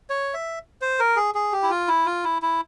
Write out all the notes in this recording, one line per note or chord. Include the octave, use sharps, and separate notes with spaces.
C#5
E5
C5
A#4
G#4
G#4
G4
E4
F4
E4
F4
E4
E4